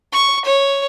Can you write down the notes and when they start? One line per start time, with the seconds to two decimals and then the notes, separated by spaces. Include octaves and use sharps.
0.13 C#6
0.45 C#5